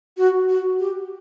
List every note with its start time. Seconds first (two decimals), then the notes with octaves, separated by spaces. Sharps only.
0.17 F#4
0.49 F#4
0.80 G4